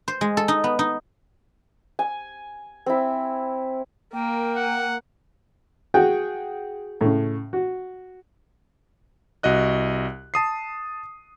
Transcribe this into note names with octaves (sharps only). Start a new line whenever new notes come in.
C5
G#3
A4
D#4
B3
D#4
G#5
C4 E4
A#3 A#4 G5
F#5
F#4 G#4 F#5 G5
A2 C#3
F#4
C2 F#4 D#5 F#6
A5 D#6 C7